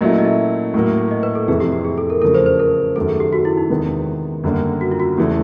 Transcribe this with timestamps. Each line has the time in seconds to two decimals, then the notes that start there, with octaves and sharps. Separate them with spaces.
0.01 A#2 F#3 A3 C#4 E4 D#5
0.18 D#5
0.25 E5
0.74 A2 F#3 A#3
1.11 D#5
1.23 B4
1.35 A4
1.48 F2 C3 E3 G#4
1.60 G4
1.72 G4
1.85 G#4
1.98 A4
2.10 A#4
2.22 E2 C#3 F3 A3 A#4
2.35 C5
2.46 C5
2.59 A#4
2.96 F#2 D#3 F#3 A3 A4
3.09 G#4
3.20 G4
3.33 F#4
3.45 E4
3.57 D#4
3.70 E2 C3 D#3 G#3 B3
4.44 F#2 D3 G3 A#3 D4
4.81 F#4
4.91 F4
5.00 F#4
5.17 E2 C#3 E3 A3 G4